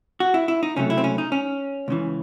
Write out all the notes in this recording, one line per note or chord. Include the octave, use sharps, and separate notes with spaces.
F#4
E4
E4
D#4
C#2 C3 F#3 A3 C#4
E4
C4
C#4
D#4
C#4
C#2 C#3 E3